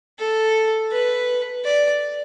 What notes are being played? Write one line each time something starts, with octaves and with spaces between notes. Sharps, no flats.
A4
B4
D5